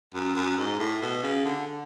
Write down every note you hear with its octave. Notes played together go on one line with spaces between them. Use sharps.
F#2
F#2
G#2
A2
B2
C#3
D3
D3